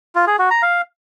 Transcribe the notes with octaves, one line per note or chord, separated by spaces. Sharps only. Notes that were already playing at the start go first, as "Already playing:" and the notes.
F4
G#4
F#4
A#5
F5